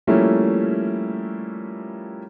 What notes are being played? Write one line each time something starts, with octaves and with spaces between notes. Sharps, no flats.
F3 G3 A3 A#3 C#4 E4